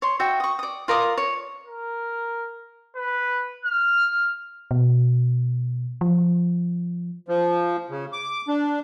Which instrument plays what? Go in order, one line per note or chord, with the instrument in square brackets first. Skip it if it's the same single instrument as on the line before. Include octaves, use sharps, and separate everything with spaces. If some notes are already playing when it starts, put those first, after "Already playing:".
[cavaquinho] C#5 C6
F#4 E5 G5
C#6 D#6
D5 D#6
F4 A#4 D5 D#6
C#5
[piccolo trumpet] A#4
B4
F6
[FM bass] B2
F3
[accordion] F3
C#3
D6
D4